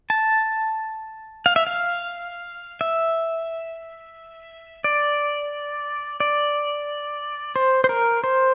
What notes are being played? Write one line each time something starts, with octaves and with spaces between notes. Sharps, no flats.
A5
F5
E5
F5
E5
D5
D5
C5
C5
A#4
C5